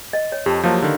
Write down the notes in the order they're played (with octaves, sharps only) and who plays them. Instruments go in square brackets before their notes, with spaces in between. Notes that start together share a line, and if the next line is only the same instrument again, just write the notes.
[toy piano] D#5
C#5
[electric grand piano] F2 [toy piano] G4 A5
[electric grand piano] F3 F#3 A#3 [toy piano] C#5 F5 A5
[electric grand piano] D3 D#3